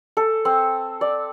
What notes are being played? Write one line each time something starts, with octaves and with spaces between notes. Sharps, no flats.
A4
C4
D5